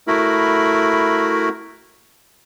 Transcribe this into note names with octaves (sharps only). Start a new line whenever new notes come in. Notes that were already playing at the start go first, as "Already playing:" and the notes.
A3 E4 F#4 A#4 B5